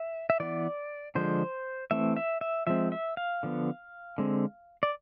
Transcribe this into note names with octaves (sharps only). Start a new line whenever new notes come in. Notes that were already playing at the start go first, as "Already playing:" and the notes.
Already playing: E5
E5
E3 B3 D5
D3 F3 G#3 C5
E3 A3 C4 E5
E5
E5
F3 G#3 C4 E5
E5
F5
D3 F3 B3
D3 G#3 C4
D5